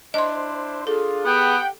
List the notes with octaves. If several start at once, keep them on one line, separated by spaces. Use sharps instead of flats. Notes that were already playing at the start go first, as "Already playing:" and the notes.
D4 E4 C5 D#5 C6
D4 F4 G#4 A4
B3 G4 F#5 G5